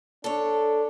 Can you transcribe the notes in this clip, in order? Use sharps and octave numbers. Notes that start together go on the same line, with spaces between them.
D4 A4 C#5